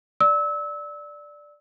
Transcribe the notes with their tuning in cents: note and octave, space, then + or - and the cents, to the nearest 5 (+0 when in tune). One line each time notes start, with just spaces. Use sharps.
D5 +0 E6 -25